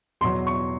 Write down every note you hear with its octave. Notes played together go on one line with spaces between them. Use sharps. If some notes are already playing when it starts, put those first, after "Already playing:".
E2 B2 F#3 C6
C#6